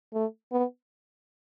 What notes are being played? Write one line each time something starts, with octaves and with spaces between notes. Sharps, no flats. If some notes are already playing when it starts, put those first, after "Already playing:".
A3
B3